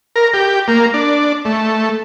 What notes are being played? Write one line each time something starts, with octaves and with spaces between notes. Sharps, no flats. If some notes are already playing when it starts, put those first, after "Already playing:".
A#4
G4
A#3
D4
A3